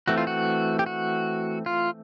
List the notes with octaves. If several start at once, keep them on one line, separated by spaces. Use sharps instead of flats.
E3 A3 C4 F#4
F4
F#4
G4
F#4
F4